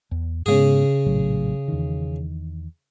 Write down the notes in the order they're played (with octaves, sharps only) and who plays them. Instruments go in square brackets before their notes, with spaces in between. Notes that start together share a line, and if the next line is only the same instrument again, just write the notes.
[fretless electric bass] E2
[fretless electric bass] G#2 G#3 B3 [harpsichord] C#3 G#4
[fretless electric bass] A#1 A2 F#3
E2 D#3